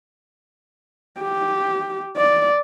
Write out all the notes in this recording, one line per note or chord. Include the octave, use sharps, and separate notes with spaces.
G4
D5